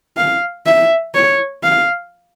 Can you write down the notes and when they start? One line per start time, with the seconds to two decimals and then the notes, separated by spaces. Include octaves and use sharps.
0.17 F5
0.66 E5
1.15 C#5
1.63 F5